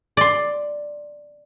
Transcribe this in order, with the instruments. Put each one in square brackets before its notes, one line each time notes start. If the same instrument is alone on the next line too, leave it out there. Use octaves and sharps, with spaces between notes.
[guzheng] D5 C6